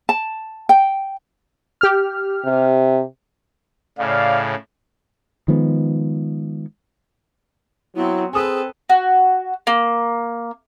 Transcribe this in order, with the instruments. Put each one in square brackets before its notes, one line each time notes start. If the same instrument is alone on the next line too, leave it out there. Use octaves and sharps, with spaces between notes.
[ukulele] A5
G5
[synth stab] G4 F6
[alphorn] C3
[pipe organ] A2 C#3 [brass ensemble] D5 F5
[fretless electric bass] D#3 F3 G#3 B3
[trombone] F#3 [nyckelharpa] B3 C4 [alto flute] E4
[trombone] C4 [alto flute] G#4 [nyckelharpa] A4 B4 [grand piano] G#5 D#6 E6
[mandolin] F#4
A#3